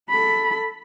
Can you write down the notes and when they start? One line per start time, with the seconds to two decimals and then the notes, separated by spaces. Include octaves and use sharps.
0.10 A4 B5